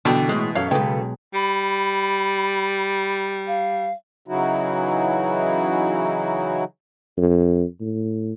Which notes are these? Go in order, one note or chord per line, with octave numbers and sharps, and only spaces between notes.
B2 D3 E3 G5 A5
A2 G#3
F#2 A4 C#5 F5
B1 C#3 G#3 A4 B4 G5
G3 B5
F5
C#3 E3 F#3 D#4 E4 F#4
F2
A2